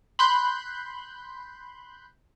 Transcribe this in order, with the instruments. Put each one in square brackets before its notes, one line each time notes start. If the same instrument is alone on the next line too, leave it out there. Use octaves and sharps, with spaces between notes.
[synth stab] B5 C6 F#6 G6